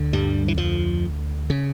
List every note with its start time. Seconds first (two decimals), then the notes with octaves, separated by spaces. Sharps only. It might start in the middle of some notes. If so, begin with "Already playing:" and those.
Already playing: D2 D3
0.13 G2 G3
0.48 E3
0.58 F2 F3
1.50 C#3